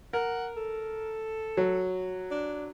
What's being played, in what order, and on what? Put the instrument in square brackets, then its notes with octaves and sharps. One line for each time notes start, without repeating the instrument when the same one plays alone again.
[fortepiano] A#4 [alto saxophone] F#5
[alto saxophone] A4
[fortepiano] F#3
[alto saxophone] D4